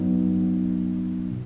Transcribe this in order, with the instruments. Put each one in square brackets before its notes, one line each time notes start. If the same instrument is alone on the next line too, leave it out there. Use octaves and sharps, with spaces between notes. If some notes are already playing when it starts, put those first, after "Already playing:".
Already playing: [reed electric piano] G2 F#3 B3 D#4
B2